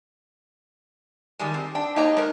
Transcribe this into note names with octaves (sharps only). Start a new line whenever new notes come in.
D#3 G3 G#3
C4
D4 G5
A#3 D#4 G5 A#5
G#3 A#4